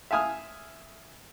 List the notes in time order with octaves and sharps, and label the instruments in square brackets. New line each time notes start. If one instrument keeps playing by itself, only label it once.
[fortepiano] E5 F5 G#5 D#6 F6